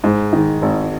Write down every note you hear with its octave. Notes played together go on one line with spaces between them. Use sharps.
G#2
D#3
G#1